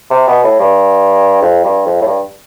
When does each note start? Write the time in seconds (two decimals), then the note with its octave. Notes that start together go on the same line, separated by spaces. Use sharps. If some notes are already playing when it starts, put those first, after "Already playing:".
0.10 C3
0.27 B2
0.44 A2
0.59 G2
1.42 F2
1.64 G2
1.85 F2
2.01 A2
2.07 G2